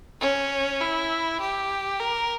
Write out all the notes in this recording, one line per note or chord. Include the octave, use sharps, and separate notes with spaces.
C#4
E4
G4
A#4